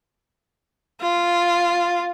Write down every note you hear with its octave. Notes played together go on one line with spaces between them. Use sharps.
F4